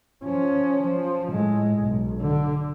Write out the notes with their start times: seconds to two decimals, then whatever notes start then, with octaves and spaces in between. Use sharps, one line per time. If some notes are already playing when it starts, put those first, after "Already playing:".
0.24 F3 C#4
0.84 F3
1.32 A2 G#3
1.79 B1
2.21 D3